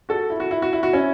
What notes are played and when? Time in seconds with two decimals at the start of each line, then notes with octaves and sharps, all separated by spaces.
0.09 F#4 A4
0.30 E4
0.40 F#4
0.51 E4
0.62 F#4
0.73 E4
0.83 F#4
0.93 C#4 E4